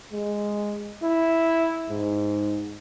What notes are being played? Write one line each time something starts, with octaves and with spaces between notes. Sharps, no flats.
G#3
E4
G#2